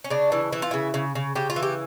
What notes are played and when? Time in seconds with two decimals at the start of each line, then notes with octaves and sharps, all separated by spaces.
0.04 C#4
0.10 C#3 D4
0.32 E3
0.52 E3 E4
0.62 F4
0.71 C#3 E4
0.94 C#3
1.15 C#3
1.36 C#3 G4
1.50 F4
1.56 E3
1.63 G4